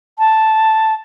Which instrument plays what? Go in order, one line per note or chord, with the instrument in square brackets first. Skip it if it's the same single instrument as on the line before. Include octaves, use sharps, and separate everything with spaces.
[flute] A5